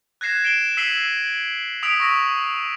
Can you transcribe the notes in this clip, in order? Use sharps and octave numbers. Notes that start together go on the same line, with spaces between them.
F#6 G#6 A#6 C7 E7
D7 E7 G7
E6 B6 C7 D#7 F#7 G7
D#6 E6 B6 D7 F7
C#6 A#6 B6